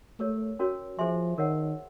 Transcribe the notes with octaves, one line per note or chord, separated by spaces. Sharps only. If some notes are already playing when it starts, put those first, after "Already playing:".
A3 G4 A#4 C#5
C#4 F#4 A#4 C#5
F3 G#4 C5 E5 G#5 C6
D#3 A#4 C#5 F#5